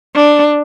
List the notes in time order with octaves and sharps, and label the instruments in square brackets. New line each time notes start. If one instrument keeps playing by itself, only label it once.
[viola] D4